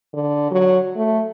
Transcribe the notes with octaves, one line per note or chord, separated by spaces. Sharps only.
D3
F#3
A3